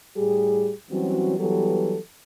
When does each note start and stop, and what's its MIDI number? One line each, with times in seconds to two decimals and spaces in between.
0.16 0.71 45
0.16 0.71 55
0.16 0.71 67
0.16 0.71 68
0.90 1.36 52
0.90 1.36 54
0.90 1.36 55
0.90 1.36 60
0.90 1.36 61
0.90 1.36 66
1.38 1.97 52
1.38 1.97 54
1.38 1.97 55
1.38 1.97 59
1.38 1.97 67
1.38 1.97 69